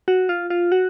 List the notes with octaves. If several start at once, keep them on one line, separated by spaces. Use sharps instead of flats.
F#4
F4
F4
F#4